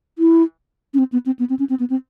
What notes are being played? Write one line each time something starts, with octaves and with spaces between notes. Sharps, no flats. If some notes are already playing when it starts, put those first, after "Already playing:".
E4
C#4
C4
B3
C4
B3
C4
C#4
C4
B3
C4